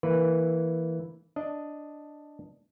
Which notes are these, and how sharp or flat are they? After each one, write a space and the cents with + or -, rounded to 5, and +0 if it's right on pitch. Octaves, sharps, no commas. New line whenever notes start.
E3 +0 A#3 +0 B4 +0
D4 +0 D#5 +0